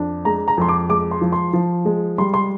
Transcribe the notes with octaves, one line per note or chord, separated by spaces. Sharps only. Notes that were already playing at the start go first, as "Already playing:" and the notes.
Already playing: F2 D4
G#3 A#5
A#5
F2 C6
D6
G#3 D6
C6
F3
C6
F3
G#3
G3 C6
C6